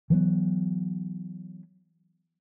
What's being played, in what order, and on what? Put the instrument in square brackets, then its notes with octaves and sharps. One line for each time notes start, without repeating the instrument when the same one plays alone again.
[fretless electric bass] E3 F#3 A#3 B3